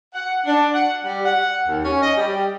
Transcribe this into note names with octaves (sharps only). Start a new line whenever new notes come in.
F#5
D4
F#5
G3
F#5
D#2
C#4
D#5
G3